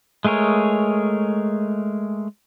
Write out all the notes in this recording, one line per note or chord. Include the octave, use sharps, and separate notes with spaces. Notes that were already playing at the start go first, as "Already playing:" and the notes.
G#3 A3 G#4 A#4 C#5